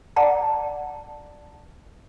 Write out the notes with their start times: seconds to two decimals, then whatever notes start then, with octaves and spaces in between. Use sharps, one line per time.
0.16 D5 F#5 A5 A#5